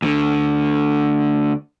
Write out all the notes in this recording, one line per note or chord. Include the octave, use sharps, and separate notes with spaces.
D2 D3